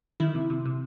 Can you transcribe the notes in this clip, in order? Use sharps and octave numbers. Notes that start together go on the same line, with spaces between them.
D#3 E4
C3
C3
C3